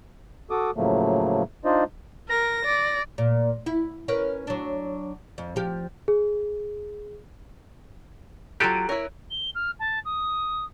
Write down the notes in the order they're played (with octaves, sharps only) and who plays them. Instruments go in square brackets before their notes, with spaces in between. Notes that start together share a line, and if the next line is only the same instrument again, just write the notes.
[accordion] F#4 A4 D6 D#6
A2 C#3 F3 F#3 A3 A#3
D4 D#4 F4 C5 D5 D#5
[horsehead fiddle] A#4 [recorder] A#6
[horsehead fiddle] D5
[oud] A#2
E4
C#4 A#4 B4
F#3 D4
F2
F3 G4
[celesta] G#4
[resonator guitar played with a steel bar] F#3 F4 A#5 [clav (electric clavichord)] G4 A4 [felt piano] F#6 D7 D#7
[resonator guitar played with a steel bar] E4 A#4 [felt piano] C#5
[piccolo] G7
F6
A5
D#6